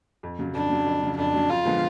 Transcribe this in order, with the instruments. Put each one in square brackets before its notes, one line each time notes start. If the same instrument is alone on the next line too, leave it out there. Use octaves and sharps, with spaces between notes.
[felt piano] F2
C#3 F#3
[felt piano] F2 [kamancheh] D4
[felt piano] C#3 F#3
F2
C#3 F#3
[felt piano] F2 [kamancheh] D4
[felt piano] C#3 F#3
[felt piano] F2 [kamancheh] F4
[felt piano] D3 F3 G#3 B3